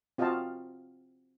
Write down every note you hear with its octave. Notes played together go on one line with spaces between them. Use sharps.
C4 F4 F#4 D#5 F5 A5